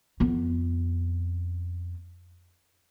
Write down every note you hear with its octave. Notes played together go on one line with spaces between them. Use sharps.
F2 B3